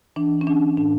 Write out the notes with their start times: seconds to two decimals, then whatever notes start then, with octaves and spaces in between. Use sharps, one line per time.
0.16 E3 D4
0.41 C#4
0.47 E3 D4
0.77 A2 D4